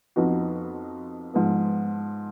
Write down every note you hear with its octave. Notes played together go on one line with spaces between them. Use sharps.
F2 F3 B3 D#4 F#4
G#2 F3 B3